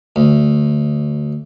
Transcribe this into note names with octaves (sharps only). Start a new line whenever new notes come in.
D2